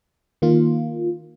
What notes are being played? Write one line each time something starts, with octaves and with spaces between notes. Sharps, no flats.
D#3 A#3 F4